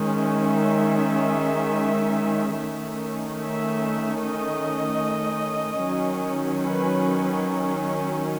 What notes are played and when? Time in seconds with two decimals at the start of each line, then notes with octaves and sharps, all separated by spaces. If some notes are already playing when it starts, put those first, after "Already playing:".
Already playing: D#3 G#3 C#4
0.19 E5
2.59 D#3 A3 C#4
3.39 E5
4.19 D#5
5.79 D#3 F#3 C#4
6.61 B4